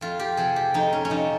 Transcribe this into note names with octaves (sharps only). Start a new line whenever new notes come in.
F2 F4
G4
C3 F3 G#4
G4
F2 D#4
C#4
C#4
C3 F3 D#4